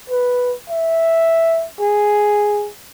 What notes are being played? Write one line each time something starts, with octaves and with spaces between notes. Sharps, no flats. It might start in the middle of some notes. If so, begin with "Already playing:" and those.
B4
E5
G#4